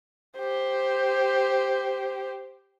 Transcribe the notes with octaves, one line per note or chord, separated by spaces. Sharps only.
G4 C5